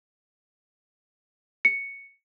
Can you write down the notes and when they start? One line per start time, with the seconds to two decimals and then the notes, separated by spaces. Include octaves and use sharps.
1.65 C#7